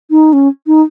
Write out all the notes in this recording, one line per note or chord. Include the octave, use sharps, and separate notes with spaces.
D#4
C#4
D#4